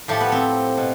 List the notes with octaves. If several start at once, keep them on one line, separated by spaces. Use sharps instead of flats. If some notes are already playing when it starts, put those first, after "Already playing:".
A2 F3 A3 G4
B3
C4
B2